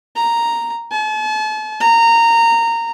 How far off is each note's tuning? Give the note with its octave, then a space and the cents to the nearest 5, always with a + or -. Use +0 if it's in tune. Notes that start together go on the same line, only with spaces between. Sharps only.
A#5 -5
A5 -40
A#5 -15